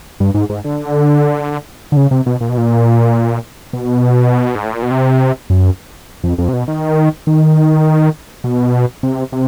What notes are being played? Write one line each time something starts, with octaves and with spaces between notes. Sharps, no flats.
G2
G#2
G#2
D3
D3
C#3
C3
B2
A#2
B2
A#2
B2
G#2
A2
A#2
B2
C3
F#2
F2
F2
C3
B2
D#3
D#3
B2
C3
C3